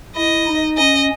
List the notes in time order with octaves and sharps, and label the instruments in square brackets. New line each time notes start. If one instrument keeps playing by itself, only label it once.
[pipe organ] E4 [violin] D#5
[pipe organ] D#4
[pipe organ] C#4 [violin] D#5